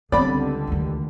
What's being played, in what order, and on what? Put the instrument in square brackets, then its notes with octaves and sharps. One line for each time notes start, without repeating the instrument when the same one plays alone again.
[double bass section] C#2 D3 G3 [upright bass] B3 C4 [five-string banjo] D5 B5
[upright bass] D2 D#3